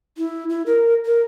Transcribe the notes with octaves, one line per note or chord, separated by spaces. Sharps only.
E4
E4
A#4
A#4